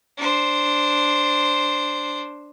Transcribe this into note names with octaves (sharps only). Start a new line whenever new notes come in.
D4 C5